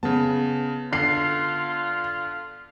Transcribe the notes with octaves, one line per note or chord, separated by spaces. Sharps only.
C#3 B3 A5
D3 F4 C7